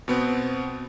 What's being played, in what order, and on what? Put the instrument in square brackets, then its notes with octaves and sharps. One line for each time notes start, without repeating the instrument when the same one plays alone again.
[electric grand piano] B2 B3 C4